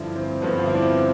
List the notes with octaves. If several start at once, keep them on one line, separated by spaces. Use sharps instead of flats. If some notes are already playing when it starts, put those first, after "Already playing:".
Already playing: G2 D3 F3 D4 E4
C4
G2 D3 F3 B3
F4
E4
D4
C4